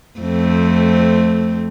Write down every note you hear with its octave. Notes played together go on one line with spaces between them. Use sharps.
F2 A3 C4